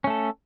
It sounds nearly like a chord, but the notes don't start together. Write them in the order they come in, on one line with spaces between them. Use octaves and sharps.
C#4 A3 A4